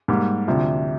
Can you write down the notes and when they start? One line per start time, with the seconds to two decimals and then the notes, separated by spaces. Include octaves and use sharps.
0.08 G#2 G3 A#3
0.47 D2 C3 F3